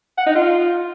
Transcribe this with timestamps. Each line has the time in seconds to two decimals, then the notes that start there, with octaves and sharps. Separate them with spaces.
0.18 F#5
0.27 D#4
0.35 F4